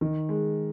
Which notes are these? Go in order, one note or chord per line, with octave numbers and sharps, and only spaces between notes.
D#3
G#3